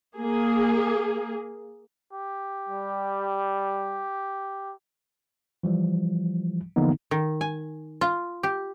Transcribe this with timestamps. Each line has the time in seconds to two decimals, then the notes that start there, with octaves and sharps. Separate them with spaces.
0.18 A#3 G#4
2.13 G4
2.69 G3
5.63 E3 F3 G3
6.76 D3 E3 F3 A#3 B3 D#4
7.11 D#3
7.41 G#5
8.01 F4
8.43 G4